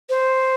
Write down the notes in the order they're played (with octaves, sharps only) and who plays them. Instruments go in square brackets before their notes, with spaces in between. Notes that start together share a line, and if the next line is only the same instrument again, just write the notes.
[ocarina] C5